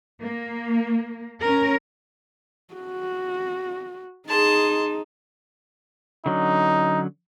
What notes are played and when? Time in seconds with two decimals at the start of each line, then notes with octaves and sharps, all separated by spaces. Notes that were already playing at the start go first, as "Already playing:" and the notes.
0.22 A#3
1.41 C#4 A#4
2.74 F#4
4.29 D#4 G#4 A5 C6
6.26 D3 F#3 C#4 D#4